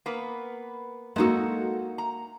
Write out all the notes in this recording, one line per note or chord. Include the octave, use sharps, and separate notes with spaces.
A#3 B3 B4
G#3 A#3 D#4 F#4 A4
A#5